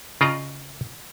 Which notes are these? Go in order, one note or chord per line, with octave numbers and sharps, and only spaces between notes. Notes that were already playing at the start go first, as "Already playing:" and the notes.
C#3 F4 D5 D#5 A#5